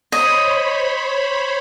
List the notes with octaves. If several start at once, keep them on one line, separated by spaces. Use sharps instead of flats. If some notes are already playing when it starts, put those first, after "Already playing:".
C5 C#5 D#5 B5